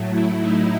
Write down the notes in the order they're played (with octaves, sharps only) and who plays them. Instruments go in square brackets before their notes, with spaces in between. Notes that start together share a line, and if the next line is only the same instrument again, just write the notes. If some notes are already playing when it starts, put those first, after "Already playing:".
Already playing: [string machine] A2 F#3 A3
E4
D#4